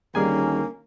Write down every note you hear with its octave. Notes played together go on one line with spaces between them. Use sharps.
D2 D#3 G3 A#3 C#4 G#4 G#5